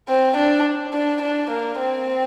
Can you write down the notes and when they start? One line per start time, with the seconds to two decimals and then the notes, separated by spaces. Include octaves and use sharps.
0.08 C4
0.37 D4
0.93 D4
1.22 D4
1.50 A#3
1.78 C4